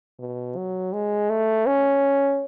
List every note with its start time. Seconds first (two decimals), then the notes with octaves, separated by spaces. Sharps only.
0.19 B2
0.57 F#3
0.93 G#3
1.30 A3
1.67 C#4